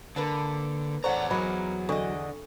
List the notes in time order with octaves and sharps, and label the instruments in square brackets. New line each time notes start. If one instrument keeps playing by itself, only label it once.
[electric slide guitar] D3 [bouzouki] A#3 B4 A5
[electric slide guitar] E2 A#5 [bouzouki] A2 D4 F#5 [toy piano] C5 C#6
[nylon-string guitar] F#3 [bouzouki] D#4 A#4 [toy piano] B5
[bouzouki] D3 D#5 [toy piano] D4 A4 C#6